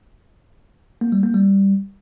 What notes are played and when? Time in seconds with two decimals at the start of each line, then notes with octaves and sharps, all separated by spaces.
1.01 A#3
1.12 G3
1.23 A#3
1.34 G3